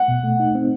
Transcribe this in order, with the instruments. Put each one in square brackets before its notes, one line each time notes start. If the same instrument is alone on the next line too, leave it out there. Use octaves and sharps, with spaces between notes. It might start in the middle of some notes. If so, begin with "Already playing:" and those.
Already playing: [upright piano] F#5
[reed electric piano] B2
A3
D#4
C4